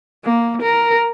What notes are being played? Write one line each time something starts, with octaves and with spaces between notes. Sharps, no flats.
A#3
A#4